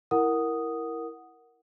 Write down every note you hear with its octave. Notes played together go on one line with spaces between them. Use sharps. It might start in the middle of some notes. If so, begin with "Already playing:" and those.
E4 A#4 F#5 D#6